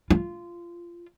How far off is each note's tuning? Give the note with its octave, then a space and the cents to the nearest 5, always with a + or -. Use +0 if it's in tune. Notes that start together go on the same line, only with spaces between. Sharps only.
F4 -15